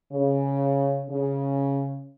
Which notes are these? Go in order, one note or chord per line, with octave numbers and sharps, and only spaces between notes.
C#3
C#3